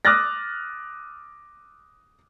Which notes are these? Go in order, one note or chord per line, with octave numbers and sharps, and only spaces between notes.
D6 D#6 F6 F#6 A6 A#6